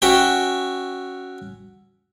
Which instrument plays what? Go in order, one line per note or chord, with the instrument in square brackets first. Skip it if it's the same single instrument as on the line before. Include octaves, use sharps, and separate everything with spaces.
[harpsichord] C#4 F#4 E5 G5